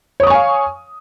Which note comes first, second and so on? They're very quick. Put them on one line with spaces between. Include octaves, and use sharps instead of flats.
C#5 D#6 C#6 G#5 F5